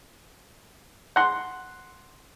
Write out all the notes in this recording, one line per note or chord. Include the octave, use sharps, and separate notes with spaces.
F#5 C6